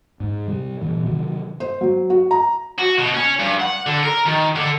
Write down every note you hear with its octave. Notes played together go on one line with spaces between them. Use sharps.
G#2
C3 G3
A#2 E3
C3 D#3 F#3
C5
F#3
F#4
A#5
F#4
B2
C#4
G2
F#5
D3
A#4
D#3
D3